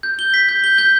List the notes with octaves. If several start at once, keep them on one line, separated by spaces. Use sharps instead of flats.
G6
G7
B6
G6
G7
G6